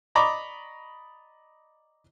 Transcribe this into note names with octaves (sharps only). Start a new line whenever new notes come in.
D5 D#5 A#5 B5 C#6 D6